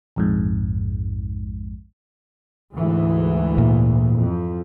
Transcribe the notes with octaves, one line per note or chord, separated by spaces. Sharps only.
A#1 F2 G#2
D2 G#2 E3
A#2
F2